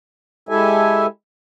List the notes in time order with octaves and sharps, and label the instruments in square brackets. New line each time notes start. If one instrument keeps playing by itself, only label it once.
[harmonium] G#3 E4 G4 A4 E5 G#5